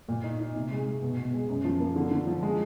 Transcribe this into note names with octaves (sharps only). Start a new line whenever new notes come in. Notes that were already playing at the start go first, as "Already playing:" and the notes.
A#2
D#4
D#4
C3
G#3
G#3
B2
B2
G#3
F#2
F3
A#3
D3
D3
F3
G#3